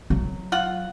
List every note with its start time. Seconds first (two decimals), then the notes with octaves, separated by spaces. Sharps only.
0.10 F#3
0.52 F4 F#5